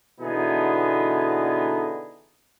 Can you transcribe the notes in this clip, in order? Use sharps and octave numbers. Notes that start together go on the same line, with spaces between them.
B2 D3 E3 B3 D#4 G#4